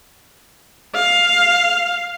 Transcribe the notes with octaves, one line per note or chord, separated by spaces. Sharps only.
F5